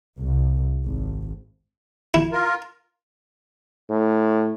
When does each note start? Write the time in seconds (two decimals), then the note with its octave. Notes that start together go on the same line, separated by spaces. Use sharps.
0.19 C2
0.85 G#1
2.14 E4
2.32 F4 A#4
3.90 A2